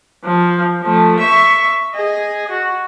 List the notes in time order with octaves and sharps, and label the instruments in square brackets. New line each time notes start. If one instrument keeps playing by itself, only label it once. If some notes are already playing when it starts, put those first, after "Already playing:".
[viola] F3
F3 A3
E5 C#6
G#4 D#5
F#4